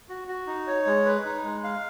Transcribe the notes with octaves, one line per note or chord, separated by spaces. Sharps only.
F#4
F#4
D#4
C#5
G#3
B4
D#4
G#3
F5